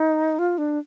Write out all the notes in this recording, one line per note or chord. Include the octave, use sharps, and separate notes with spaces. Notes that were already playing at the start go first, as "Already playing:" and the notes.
Already playing: D#4
F4
D4